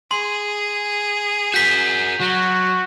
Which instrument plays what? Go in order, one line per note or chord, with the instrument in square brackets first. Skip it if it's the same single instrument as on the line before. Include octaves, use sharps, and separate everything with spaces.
[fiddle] G#4 [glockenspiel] C6
[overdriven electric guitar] F#4 A#4 [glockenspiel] G6 B6
[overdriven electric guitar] F#3 [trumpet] F#4